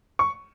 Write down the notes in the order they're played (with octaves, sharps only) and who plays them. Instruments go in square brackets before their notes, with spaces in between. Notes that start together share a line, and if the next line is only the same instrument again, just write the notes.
[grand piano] C#6